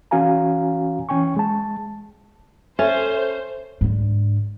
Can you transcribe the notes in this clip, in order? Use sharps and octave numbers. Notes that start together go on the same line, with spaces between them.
E3 C#4 F#4 F5 G#5 A#5
E3 C#4 G5 G#5 C#6
G#3 A5
C#4 A4 C5 E5
G#2 D3